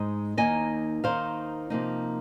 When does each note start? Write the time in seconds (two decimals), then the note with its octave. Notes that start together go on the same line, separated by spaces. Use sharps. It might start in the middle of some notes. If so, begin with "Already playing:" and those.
Already playing: G#2 G#3 D#4
0.37 D#2 D#3 A#3 D#4 D#5 G#5
1.03 D#2 D#3 A#3 D#4 C5 F5
1.70 C3 F3 A#3 D#4